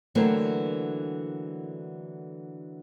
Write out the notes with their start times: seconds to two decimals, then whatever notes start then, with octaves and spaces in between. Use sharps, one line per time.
0.15 D3 E3 F#3 A3 A#3 C4